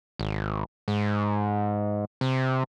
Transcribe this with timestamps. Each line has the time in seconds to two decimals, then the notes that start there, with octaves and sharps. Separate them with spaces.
0.19 G#1
0.88 G#2
2.21 C3